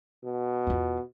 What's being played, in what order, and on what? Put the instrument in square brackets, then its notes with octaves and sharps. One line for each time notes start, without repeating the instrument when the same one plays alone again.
[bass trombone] B2
[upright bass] E2 F4